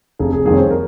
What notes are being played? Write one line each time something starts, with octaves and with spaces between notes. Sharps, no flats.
F1 G#4
G#4
F2 D#3 G3 A#3 G#4
C#5
C5
A#4